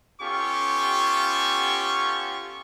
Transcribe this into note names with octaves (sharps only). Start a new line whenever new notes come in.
B3 C#4 F4 G4 A4 C#6